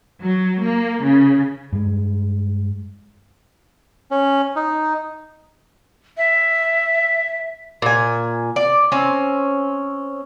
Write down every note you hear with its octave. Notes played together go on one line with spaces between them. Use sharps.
F#3
A#3
C#3
G2 G#3
C#4
D#4
E5
A#2 G#5
D5
C4 C#4